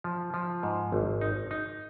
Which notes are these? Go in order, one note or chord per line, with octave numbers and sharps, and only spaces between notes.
F3
F3
G#2
G#1
D#4
D#4